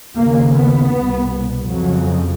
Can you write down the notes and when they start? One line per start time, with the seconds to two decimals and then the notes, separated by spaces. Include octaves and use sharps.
0.16 D#2 C#3 A#3
0.55 B3
0.92 C2 B2
1.69 F2 C#3 F#3